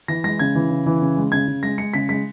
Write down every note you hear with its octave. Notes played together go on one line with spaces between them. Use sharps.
E3 A#6
G#3 A#6
C#3 G#6
E3
C#3
E3
C#3
G#3
C#3 G#6
C#3
G#3 A#6
G#3 C#7
C#3 B6
G#3 B6